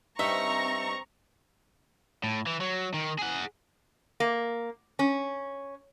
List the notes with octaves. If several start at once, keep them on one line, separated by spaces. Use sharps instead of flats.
G2 C4 D#4 E5 A#5 C#6
A2
E3
F#3
D#3
G#4 F#5
A#3
C#4